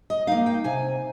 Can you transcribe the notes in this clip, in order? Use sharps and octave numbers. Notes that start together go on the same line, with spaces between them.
D#5
A#3 D#4 F5
G5
C3 G#5